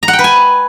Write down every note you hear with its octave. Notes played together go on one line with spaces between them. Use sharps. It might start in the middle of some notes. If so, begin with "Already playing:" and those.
A#5
F#5
G5
B4
G#5